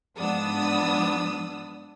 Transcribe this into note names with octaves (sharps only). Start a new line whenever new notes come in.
G#2 F3 B3 D4 D#6 E6